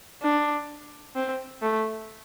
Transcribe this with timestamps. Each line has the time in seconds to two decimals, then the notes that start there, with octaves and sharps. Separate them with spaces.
0.23 D4
1.15 C4
1.62 A3